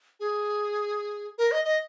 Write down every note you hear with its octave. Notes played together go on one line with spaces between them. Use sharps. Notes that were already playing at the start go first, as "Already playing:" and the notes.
G#4
A#4
D#5
D#5